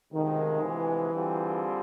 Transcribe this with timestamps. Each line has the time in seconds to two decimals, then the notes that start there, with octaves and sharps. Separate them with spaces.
0.12 D2 C3 D#3 F3 G#3
0.62 E3
1.12 D3 G3 C4 F4 G#4